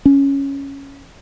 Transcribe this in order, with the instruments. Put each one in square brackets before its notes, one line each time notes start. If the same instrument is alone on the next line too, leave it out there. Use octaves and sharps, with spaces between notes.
[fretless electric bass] C#4